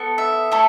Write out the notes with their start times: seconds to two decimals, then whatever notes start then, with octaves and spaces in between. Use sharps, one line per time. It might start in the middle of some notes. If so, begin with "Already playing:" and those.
Already playing: B3 A4
0.18 E5
0.51 A3 E4 A4